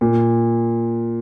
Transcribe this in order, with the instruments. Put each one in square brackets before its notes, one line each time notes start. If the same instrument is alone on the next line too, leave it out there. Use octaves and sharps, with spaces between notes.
[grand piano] A#2